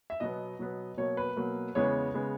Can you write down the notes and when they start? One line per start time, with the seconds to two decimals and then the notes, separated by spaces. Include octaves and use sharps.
0.10 E5
0.20 B2 F#3 B3 D#5
0.59 B2 F#3 B3
0.97 B2 F#3 A#3 C#5
1.17 B4
1.36 B2 F#3 A#3
1.75 E2 C#3 G#3 B3 C#5
2.14 C#3 G#3 B3